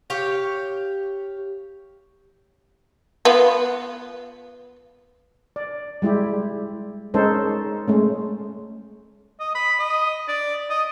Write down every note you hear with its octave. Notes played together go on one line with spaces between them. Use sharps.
G4 C#5 F5
B3 F4
D5
G3 G#3 E4 G4
G#3 C#4 D#4 A4 A#4 C5
G#3 A3 C#4
D#5
B5
D#5
D5
D#5